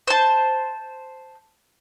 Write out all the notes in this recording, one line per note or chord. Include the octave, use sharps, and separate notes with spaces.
C5 A5